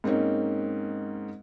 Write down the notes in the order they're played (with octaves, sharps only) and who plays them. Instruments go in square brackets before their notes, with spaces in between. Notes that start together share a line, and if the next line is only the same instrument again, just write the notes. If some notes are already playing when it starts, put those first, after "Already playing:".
[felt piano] G#2 A#3 C4 C#4 D#4